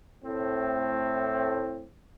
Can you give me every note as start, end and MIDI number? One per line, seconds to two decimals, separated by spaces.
0.24 1.88 45
0.24 1.88 60